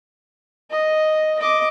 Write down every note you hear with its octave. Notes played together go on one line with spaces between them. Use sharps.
D#5
D#5 D6